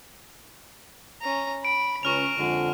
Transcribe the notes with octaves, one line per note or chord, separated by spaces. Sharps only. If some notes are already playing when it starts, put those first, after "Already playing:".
C#4 A#5
B5 D7
C#2 C#4 A#5 C#6 F6 F7
F2 D3 G#3